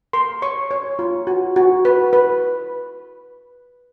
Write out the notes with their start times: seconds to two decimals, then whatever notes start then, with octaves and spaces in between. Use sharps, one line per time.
0.13 A#4 C6
0.42 C#5 C#6
0.71 C#5
0.99 F4
1.27 F#4
1.56 F#4
1.85 B4
2.13 B4